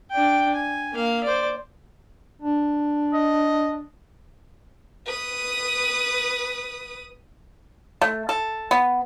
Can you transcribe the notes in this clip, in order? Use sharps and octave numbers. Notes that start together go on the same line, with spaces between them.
D4 G5
G#5
A#3 F5
C5 D5
D4
D#5
B4 D#6
A3
A4
B3